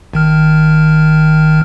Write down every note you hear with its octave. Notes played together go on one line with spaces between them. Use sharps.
G#1 D#3 F6